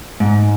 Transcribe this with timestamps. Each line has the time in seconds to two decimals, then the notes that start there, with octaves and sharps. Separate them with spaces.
0.20 G#2